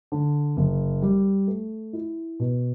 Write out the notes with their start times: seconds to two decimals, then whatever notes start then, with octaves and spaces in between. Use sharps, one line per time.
0.12 D3
0.57 F#1
1.02 G3
1.48 A3
1.93 E4
2.39 B2